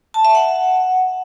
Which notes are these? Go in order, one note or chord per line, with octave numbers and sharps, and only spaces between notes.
A5
E5
F#5